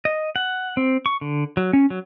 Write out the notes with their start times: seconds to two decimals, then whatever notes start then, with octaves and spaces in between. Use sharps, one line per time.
0.05 D#5
0.36 F#5
0.77 C4
1.06 C#6
1.21 D3
1.57 F#3
1.73 C#4
1.90 F#3